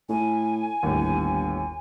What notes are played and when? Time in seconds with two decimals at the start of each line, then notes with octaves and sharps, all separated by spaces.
0.09 A2 G#5
0.83 G1 D#2 A2